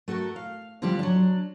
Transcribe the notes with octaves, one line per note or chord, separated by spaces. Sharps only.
A3 F#4 A4 A#4
F5
D3 F3 G3 D4 F4 G4
F#3 D4